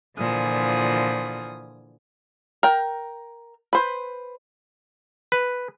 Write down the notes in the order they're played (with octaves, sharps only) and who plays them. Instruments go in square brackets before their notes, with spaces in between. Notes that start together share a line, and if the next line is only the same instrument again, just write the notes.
[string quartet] A#2 D3 E3 F3 G#5 D#6
[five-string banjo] A#4 G5
B4 C5
[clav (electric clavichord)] B4